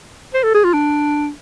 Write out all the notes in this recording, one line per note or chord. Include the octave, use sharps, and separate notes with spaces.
C5
A4
G#4
F4
D4